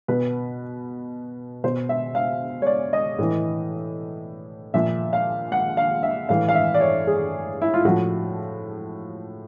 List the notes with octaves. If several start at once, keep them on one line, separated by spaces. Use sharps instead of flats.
B2 B4
B2 C5
E5
F5
C#5
D5
D#5
A2 E3
A#2 F3 E5
F5
F#5
F5
E5
A2 E3 F5
F5
E5
D5
C#5
G#4
E4
F4
A2 F3 F#4